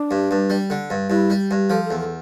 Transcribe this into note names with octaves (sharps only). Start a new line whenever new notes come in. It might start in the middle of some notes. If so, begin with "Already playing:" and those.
Already playing: D4
G2
G2
G3
D3
G2
G2 E4
G3
G2
F3 A4
A4
E2
A4